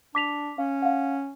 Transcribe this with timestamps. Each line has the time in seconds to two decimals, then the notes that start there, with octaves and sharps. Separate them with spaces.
0.15 D4 D6 B6 F7
0.58 C#4 F5
0.82 F5 F#5